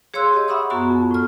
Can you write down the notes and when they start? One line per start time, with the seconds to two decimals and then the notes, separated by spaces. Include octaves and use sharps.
0.14 G#4 C#5 F5 C6 E6 F#6
0.33 G4 D#5
0.48 E5 F#5 B5 C#6 D#6 E6
0.70 F#2 B3 F#4 A#5 C#6
0.90 F2
1.11 A2 F6